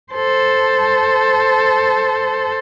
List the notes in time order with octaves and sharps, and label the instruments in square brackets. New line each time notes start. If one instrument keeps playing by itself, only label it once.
[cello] A4 C5